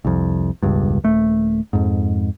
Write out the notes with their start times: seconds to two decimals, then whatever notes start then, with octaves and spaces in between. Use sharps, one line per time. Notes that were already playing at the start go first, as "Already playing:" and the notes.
0.05 C2 F2
0.62 E1 C#2 G2
1.04 D#1 A3
1.73 F2 G#2